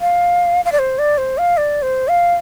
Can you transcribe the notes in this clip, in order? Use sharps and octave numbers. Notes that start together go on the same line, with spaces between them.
F5
F5
D5
C5
D5
C5
F5
D5
C5
F5